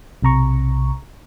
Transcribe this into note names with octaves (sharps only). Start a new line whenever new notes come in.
B1 C3 A#5 C#6